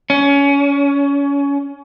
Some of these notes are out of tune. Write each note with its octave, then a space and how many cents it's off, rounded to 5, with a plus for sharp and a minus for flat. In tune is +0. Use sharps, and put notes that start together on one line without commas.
C#4 +25